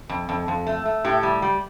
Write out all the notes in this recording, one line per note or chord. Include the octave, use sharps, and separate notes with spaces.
F2
F2
F2
A3
A3
A2 G4
G3
G3